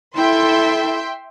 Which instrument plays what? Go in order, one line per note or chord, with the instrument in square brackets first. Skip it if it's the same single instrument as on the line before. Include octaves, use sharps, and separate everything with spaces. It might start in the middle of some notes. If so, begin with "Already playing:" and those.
[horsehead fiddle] E4 A4 [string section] E5 G5 C6